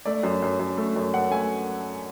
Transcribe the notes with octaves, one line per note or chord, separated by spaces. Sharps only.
A3 D5
F#2
F#2
F#2
A3
F#2
F#2 F#5
A3 G#5